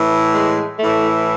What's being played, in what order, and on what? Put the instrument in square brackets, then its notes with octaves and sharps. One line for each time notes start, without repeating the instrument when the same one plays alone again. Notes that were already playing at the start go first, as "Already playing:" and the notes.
Already playing: [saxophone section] A2 E3
G#3
A2 E3 A3